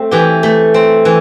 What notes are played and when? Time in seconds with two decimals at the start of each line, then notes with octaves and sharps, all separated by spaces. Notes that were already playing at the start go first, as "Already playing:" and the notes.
Already playing: A3 C4 A4
0.11 E3 G4
0.43 A3
0.74 C4
1.05 E3